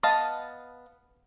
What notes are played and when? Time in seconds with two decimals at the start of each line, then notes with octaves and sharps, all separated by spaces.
0.03 B3 D#5 F5 A5